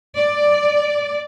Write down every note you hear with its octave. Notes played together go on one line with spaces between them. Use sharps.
D5